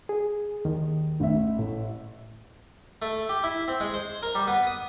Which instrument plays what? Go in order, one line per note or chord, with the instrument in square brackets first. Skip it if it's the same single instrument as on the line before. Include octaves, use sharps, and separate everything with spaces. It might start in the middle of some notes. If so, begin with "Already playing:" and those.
[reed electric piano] G#4
D#2 D#3
[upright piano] A1 E5
[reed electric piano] A2
[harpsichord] A3
G4
E4
C4
G#3
C5
A#4
G3
B3
D#6